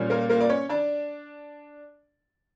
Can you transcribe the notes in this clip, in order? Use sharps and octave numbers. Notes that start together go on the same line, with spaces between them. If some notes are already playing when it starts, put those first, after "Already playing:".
Already playing: A#2 G3 C#4
A#3 A#4
A#3 A#4
D5
C#4 C#5
D4 D5